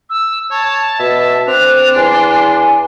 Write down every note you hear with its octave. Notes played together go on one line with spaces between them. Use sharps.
E6
C#5 A5
B2 E5
C4 D4 F#6 F7
E2 G#5 C6